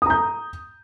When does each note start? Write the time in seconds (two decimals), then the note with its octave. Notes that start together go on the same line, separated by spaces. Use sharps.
0.02 D#6
0.06 A#5
0.10 G6